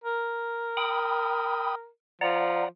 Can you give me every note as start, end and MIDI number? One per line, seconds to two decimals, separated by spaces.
0.04 1.89 70
0.77 1.75 79
0.77 1.75 83
0.77 1.75 87
2.21 2.65 53
2.21 2.69 74
2.21 2.69 78
2.21 2.69 82